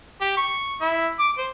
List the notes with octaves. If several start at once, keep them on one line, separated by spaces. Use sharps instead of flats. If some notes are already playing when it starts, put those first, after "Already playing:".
G4
C#6
E4
D6
C5